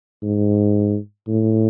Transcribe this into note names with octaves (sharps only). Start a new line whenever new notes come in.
G#2
A2